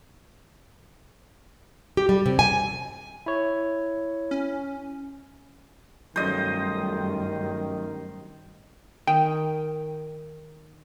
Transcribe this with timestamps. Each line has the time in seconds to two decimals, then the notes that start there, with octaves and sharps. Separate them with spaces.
1.97 G4
2.09 G3
2.26 C3
2.39 G#5
3.26 E4 C#5
4.31 C#4
6.16 G2 D#3 F#3 G3 A3 C#4 C5 D#5
9.07 D#3 G5